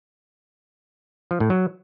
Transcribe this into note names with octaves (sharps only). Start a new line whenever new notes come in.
F3
A2
F#3